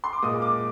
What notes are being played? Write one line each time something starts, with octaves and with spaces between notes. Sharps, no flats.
C6
D6
A#2 G#3 D#6
D6